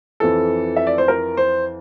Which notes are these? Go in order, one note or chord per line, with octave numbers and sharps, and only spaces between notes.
F2 E3 A4
E5
D5
C5
A#4
C5